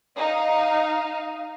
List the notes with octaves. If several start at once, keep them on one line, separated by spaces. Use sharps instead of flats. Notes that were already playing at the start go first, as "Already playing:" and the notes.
D#4 F5